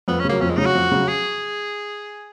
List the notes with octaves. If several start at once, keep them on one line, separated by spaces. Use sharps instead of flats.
F2 B3
C#4
C#3 F#3 A#3
F2 C#4
G#3
C#3 F#3 D#4
F#4
F2
C#3 F#3
G#4